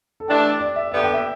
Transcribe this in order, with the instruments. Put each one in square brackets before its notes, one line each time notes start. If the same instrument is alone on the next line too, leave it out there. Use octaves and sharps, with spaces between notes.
[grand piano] A4
[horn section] E3 A3 D4 [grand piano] G4
[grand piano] D5
E5
[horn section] D3 B3 G4 [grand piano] D5
[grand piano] G5
E5